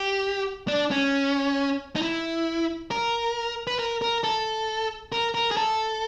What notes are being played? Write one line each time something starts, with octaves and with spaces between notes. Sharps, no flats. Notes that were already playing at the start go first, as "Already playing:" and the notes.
Already playing: G4
D4
C#4
D#4
E4
A#4
B4
A#4
A#4
A4
A#4
A#4
G#4
A4